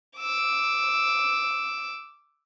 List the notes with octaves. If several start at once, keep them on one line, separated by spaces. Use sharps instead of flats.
D6 E6